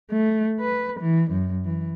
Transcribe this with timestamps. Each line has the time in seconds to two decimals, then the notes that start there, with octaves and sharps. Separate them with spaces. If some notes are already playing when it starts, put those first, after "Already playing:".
0.11 A3
0.60 B4
1.00 E3
1.31 F#2
1.65 E3